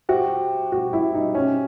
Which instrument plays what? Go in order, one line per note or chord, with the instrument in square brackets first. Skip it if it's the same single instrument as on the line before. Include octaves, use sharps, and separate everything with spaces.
[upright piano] F#4 [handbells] G4 C5 E5 G5
[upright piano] F#4
E4
D#4
C#4